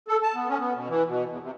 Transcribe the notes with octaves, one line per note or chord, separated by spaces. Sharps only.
A4
A5
B3
C#4
B3
B2
E3
B2
E2
C3